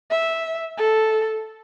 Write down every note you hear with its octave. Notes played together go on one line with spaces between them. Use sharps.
E5
A4